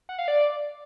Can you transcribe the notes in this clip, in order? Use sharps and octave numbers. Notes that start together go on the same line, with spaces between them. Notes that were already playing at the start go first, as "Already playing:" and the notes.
F#5
F5
D5